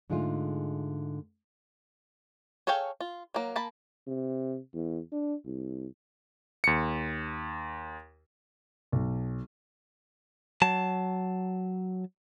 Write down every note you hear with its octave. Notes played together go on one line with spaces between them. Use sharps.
G#2 D3 G#3 A3 D#4 F4
G#4 A4 C#5 F5 G5
F4
F#3 A#3
A#3 A5 B5
C3
E2
D4
C2
D#2 C#7
B1
F#3 A5